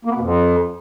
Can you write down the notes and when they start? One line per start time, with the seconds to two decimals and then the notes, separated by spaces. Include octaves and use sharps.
0.05 A#3
0.10 B3
0.15 B2
0.20 F2